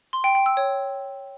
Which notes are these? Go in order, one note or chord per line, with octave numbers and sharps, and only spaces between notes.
C6
G5
G5
E6
C#5